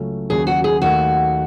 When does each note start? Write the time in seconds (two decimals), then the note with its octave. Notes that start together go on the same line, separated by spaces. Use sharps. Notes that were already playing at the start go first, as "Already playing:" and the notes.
Already playing: C#2 C#3 F#3 A3 C#4
0.30 D#2 C#3 F#3 G#4
0.47 F#4
0.64 G#4
0.81 D#2 D#3 A3 F#4